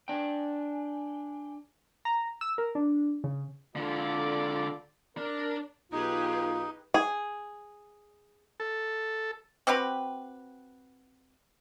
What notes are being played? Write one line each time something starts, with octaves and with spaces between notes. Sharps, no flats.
D4 G5 G#5
A#5
E6
A#4
D4
C#3
D3 G#3 F4 A4 D5
D4 A#4 D5
B1 D#4 F4 G4 G#4 B4
G#4
A4
C4 F#4 G4 B4